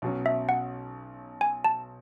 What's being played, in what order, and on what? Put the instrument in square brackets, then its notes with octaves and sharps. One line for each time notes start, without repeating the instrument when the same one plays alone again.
[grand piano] B1 B2 F#3 C#4
[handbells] E5
F#5
G#5
A5